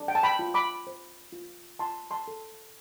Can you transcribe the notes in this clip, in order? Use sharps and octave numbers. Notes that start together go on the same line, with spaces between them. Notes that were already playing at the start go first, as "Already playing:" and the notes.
Already playing: D4
G5
A5
G5 B5
F4
B5 D6
C5
F4
F4 A5 C6
A5 C6
A4